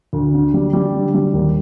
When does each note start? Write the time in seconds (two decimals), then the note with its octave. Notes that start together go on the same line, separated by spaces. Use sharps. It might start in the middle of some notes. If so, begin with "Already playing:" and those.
0.13 D2
0.34 D3
0.54 G3
0.73 G3
0.94 D3
1.14 G3
1.33 D#2